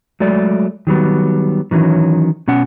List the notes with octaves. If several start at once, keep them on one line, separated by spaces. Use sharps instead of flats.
F#3 G#3 A3 D5
D#3 F#3 G3 B3
D#3 E3 F#3 C#4
B2 C#4 F#5